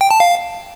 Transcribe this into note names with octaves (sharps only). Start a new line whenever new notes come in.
G5
A5
F5